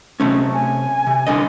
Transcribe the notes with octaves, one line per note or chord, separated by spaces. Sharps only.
C3 A3 C#4
G#5
C3
C2 D3 D#5